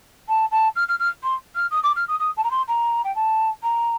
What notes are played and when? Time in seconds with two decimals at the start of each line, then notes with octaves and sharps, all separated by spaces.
0.28 A5
0.51 A5
0.75 F6
0.88 F6
0.99 F6
1.23 C6
1.55 F6
1.71 D#6
1.83 D6
1.95 F6
2.08 D#6
2.19 D#6
2.36 A5
2.43 A#5
2.50 C6
2.67 A#5
3.04 G5
3.15 A5
3.62 A#5